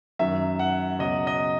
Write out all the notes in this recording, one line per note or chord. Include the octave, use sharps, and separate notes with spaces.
F#2 D#3 F#3 E5
F#5
C#2 B2 F#3 D#5
D#5